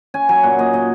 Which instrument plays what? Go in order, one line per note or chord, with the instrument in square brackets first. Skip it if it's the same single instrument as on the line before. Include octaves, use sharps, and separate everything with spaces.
[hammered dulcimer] C#4 G#5
F#3 G#5
A#2 F#5
A#2 D#5
A#2 D#5